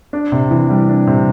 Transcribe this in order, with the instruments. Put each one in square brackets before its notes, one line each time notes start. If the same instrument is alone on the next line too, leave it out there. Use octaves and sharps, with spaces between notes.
[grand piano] D4
C3
E3
G3
D4
C3